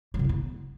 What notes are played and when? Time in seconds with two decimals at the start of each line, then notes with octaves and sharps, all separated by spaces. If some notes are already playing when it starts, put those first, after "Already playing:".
0.14 F#3
0.19 C#3
0.24 E4
0.29 B3